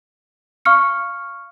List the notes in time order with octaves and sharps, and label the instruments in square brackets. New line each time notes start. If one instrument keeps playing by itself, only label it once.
[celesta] F5 C#6 F6 C#7